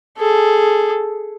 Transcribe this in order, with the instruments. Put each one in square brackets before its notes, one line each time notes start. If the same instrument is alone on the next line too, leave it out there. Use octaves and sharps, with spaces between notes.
[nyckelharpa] G#4 A4